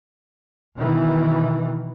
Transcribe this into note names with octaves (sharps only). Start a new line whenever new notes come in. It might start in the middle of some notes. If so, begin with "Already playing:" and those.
B2 D#3 E3